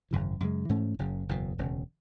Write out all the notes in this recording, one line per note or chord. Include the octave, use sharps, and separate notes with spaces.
G#1 F#2 C#3 E3
F#2 C#3 G#3
G#2 E3 A3 C#4
F#1 F#2 C#3
F#1 E2 B2
E1 D2 C#3